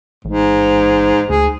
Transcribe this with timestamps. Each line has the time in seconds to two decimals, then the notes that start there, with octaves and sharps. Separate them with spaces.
0.25 A1 G#2
1.30 D2 G#4